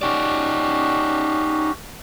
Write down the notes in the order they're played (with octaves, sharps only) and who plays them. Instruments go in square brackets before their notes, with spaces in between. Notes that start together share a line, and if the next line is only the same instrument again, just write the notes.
[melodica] C#4 F#4 G4 [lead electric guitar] D#4 D5